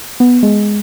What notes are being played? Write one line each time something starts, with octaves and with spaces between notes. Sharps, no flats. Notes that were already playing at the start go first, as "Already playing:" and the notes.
B3
G#3